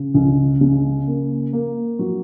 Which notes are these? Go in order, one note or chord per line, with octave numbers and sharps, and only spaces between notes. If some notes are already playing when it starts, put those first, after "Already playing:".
Already playing: C#3
C#2
C#3
A#3
A#3
F#3